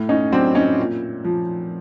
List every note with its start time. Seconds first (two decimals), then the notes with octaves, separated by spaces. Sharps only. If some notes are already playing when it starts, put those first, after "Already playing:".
Already playing: A2
0.09 C#4 D#4
0.32 F#3 C4 D4
0.55 C#4 D#4
0.78 A#2
1.25 F3